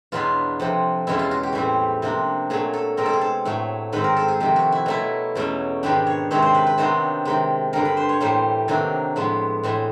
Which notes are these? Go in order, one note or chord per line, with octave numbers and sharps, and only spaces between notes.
E2 B2 F#3 B3 D4 F4
F2 C3 F3
E2 B2 G#3 C#4 E4
F4
F#4
G4
A2 E3 G3 C4
C3 F3 A#3 D4
A#2 F#3 A3 G#4
A4
B2 G#3 C4 A#4
A4
G#4
A4
A2 F#3 A3
G#2 D#3 G#3 C4 B4
A#4
A4
G#4
F2 C3 D#3 G4
F#4
E4
B2 F#3 A3 E4
E2 B2 F#3 A3 C#4
G#2 D#3 G#3 B3 D4 G4
C#5
C3 D#3 G#3 C4 C#5
C5
B4
B4
C3 D#3 F#3 B3 D4 C5
C3 D#3 G#3
G2 D3 G3 A#4
B4
C5
C#5
A2 E3 G3 A#3 C5
C3 D#3 F#3 A#3 D4
A2 F3 G#3 B3
A2 E3 G#3